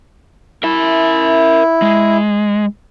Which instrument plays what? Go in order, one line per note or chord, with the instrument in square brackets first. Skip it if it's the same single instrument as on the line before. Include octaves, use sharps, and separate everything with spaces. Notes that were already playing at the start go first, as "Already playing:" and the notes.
[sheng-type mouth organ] E4 [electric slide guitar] A#4 E5
[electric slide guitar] G#3